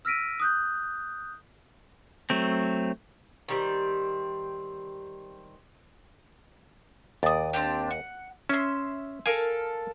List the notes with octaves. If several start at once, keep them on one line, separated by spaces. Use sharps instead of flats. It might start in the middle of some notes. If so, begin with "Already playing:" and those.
E6 F6 A#6 B6 D7 D#7
D#6 F#6 G6
F#3 A3 C4
D#3 G3 C4
D#2 D5 D#6
C4 D4 G4
F#5
C#4 E5 C6
A4 A#4 F5 G#5